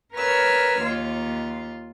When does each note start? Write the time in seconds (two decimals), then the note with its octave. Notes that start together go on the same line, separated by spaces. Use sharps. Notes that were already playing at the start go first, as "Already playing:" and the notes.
0.14 A#4 B4 C#5 E6 F6
0.81 D#2 F4